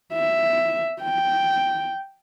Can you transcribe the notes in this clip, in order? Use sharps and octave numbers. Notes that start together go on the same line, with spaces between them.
E5
G5